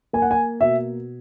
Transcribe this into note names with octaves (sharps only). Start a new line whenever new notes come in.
A#3 G#5
F#5
G#5
B2 E5